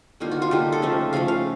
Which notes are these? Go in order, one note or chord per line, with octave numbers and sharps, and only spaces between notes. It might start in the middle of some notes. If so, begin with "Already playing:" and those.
D3 G3 A#3 D#4 F4
F#4
F4
D3 G3 A#3 D#4 G4
A4
C#3 F3 A3
C#3 F3 A3 F5
F5